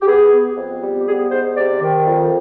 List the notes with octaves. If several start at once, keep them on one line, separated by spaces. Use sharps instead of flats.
G4
B3 G#4
B3
F2
G3
G4
B3 G#4
G#2 C5
C3 D5
D#3
F2